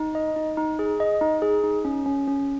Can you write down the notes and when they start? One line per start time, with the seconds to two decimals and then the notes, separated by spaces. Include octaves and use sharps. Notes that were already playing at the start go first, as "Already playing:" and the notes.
Already playing: D#4
0.15 D#5
0.36 D#4
0.57 D#4
0.79 G#4
1.00 D#5
1.21 D#4
1.42 G#4
1.63 D#4
1.85 C#4
2.06 C#4
2.28 C#4